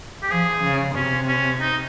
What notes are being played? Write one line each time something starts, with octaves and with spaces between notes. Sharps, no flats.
G4
F3 G#4
C#3
C3 C#4
C#4
D#4